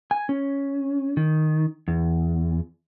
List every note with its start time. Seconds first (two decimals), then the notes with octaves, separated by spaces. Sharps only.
0.11 G#5
0.29 C#4
1.17 D#3
1.88 E2